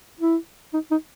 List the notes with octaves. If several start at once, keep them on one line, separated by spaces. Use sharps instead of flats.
E4
D#4
D#4